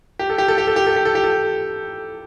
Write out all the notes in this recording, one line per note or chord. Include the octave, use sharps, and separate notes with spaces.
G4
A4
G4
A4
G4
A4
G4
A4
G4
A4
G4
A4